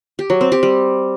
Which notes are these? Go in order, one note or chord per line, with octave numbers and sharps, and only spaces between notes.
G4
F#3
C4
G4
G3